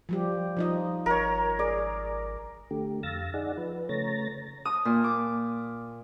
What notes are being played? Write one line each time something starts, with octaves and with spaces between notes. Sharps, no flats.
F3 G3 G4
F3 D#4 D#5
G#1 A#4 C#5
G#4 D5
D3 A3 G4
F2 F5 E6 A6 A#6
D#4 G#4 D5 F#5
F3 B4
C#3 A3 C#5 A#5 A6 A#6
D#6
A#2
D6